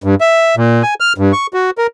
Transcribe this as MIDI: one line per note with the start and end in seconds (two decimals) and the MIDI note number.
0.04 0.15 43
0.21 0.55 76
0.57 0.83 46
0.83 0.94 80
1.00 1.13 89
1.18 1.32 43
1.33 1.47 85
1.54 1.70 66
1.78 1.87 70